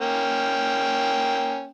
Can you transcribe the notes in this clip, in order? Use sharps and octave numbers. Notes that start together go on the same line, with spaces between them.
A#3 C#4 G5